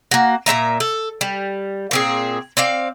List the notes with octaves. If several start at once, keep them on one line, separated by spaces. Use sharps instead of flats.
A#3 F#4
A#2 C4 E5 A#5
A4
G3
A#2 C4 G#4
C4 D5 F5